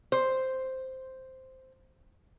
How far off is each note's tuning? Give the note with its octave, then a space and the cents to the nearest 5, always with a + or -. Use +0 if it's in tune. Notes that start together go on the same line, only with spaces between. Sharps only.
C5 +0